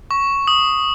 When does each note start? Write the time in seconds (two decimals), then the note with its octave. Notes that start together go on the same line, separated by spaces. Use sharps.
0.11 C#6
0.47 D#6